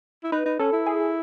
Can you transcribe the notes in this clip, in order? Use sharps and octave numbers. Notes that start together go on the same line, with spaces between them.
E4
D#4 B4
D#4
C#4 A4
E4
G#4